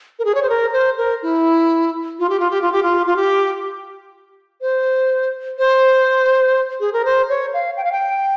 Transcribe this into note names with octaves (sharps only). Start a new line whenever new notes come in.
A#4
G#4
C#5
C5
A#4
C5
A#4
E4
F4
G4
F4
G4
F4
G4
F4
F4
G4
C5
C5
G#4
A#4
C5
C#5
F5
G5
F5
G5